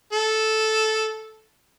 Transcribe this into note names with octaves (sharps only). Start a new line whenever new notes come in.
A4